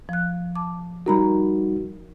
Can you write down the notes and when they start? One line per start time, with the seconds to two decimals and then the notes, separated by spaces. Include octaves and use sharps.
0.09 F3 F#6
0.56 A5 D6
1.06 G3 D#4 F#4 A#4 A#5 B5